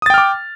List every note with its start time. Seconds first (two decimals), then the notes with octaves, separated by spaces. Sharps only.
0.02 D#6
0.06 A6
0.10 G5
0.14 F6
0.18 D6